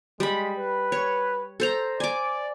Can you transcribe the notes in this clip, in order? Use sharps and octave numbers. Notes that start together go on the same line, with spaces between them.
G3 G#3 B5
B4
C#5
A4 C5 A#5
D5 G#5 D6